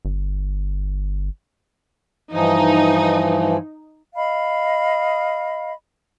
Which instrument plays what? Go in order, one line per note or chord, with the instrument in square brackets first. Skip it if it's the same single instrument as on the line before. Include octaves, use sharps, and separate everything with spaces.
[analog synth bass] G1
[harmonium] G2 E3 F3 [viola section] D#4
[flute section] D#5 F5 B5